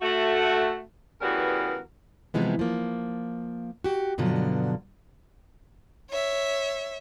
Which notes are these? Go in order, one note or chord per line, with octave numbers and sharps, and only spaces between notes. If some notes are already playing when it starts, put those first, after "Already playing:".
A3 F#4
C#3 E3 G3 B3 F#4 A#4
C3 E3 F3 G#3 B3
F3 A#3
F#4 G4
G2 B2 D3 F3 F#3
C#5 E5